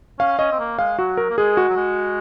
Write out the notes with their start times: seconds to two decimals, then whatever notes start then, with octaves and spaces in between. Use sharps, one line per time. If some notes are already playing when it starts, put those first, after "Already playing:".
0.19 C#4 F5
0.39 C#4 D#5
0.52 C4
0.59 A#3
0.79 G#3 F5
0.99 F#3 F#4
1.17 A#4
1.30 A#3
1.38 G#3 G#4
1.57 F#4
1.69 F#3
1.77 G#3